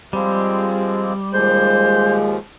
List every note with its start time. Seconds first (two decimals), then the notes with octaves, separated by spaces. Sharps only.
0.13 F3 G3 G#3 C4
1.34 D#2 F3 G#3 C5